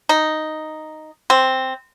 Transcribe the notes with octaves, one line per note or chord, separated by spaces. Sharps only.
D#4
C4